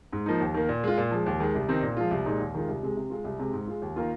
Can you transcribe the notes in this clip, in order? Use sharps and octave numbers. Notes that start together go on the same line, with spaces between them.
G#2
F3 A#3 D#4
D#2
D#3 A#3
A#2
G#3 F4
A#2
F3 G#3
D#2
D#3 G#3
C2
C3 D#3 C4 D#4
A#2
F3 G#3 F4
C2
A#2 G#3 D#4
D#2
D#3 G#3 F4
C2
C3 G#3
C3
G#3 F4
C2
C3 G#3
G#2
G#3 F4
D#2
D#3 A#3 F4